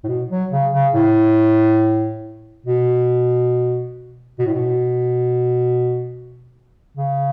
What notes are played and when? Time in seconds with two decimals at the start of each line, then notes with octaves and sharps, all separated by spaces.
0.04 A2
0.08 B2
0.30 F#3
0.51 C#3
0.73 C#3
0.94 A2
2.66 B2
4.39 B2
4.46 A2
4.54 B2
6.97 C#3